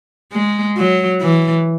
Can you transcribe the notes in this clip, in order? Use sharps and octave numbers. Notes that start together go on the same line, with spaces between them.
G#3
F#3
E3